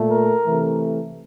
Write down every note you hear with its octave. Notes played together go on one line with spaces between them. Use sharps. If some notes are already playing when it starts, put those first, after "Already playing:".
Already playing: A#2 A3
A#4
C3 E3 A3